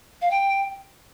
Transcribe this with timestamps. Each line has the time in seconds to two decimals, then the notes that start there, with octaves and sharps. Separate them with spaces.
0.22 F5
0.31 G5